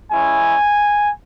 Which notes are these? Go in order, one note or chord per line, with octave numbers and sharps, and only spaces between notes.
G#3 C#4 E4 G#5